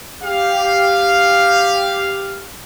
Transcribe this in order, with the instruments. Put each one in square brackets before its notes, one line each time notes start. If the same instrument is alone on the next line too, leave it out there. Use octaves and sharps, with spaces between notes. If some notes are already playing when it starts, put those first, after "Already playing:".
[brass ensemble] G4 F5